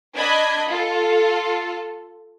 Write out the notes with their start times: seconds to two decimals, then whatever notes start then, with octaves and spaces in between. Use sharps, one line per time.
0.15 D4 D#5 B5 G#6
0.69 F4 A4